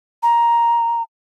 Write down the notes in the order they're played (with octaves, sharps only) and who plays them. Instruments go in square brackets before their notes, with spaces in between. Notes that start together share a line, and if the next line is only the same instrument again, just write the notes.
[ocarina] A#5